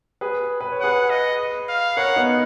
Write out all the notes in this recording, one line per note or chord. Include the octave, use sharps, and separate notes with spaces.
G#4 B4
B4
C#5
G#4 B4 F#5
D#5
F5
A#4 C#5 F#5
B3 D#4